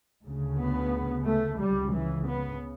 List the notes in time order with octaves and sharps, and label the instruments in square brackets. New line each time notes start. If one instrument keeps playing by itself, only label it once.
[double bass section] D2 C#3
B3
A3
C#2 C#3 G3
E3
B3